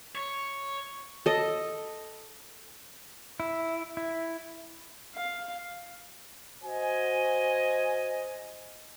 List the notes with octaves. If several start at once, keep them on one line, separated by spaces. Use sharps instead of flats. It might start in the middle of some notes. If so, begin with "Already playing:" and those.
C#5
A4 D#5
E4
E4
F5
F#4 C5 D#5 G#5